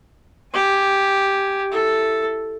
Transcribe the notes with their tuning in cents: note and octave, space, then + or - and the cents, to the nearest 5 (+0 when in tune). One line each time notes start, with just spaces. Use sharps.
G4 +0 G#5 +0
E4 +0 A4 +0